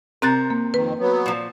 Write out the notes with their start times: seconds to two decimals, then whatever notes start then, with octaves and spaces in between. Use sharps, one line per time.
0.22 C3 C4 A#4 F#6 A6
0.50 A#3
0.74 F2 D#3 B4
0.99 F#3 B3
1.26 A#2 F3